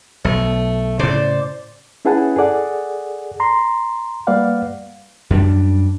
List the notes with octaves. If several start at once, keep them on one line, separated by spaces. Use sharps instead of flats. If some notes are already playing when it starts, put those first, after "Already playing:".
B1 A3
A2 C#3 C5 D5
C#4 E4 G#4 B4 F#5 A5
G#4 A4 D5 F#5
A#5 C6
G3 A#3 B4 D5 F5 F#5
F#2 G3 D4